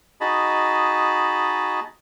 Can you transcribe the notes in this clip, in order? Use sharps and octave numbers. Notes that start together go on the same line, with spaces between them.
D#4 F#4 G#4 D#5 A5 B5